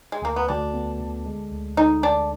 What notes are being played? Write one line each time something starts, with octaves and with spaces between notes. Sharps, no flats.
G#3
D2 A#3
B3
D2 D4
B3
D3
G#3
D2
D3 D#4
D2 D4